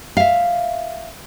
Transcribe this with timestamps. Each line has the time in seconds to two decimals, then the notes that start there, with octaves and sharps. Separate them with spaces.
0.17 E5 F5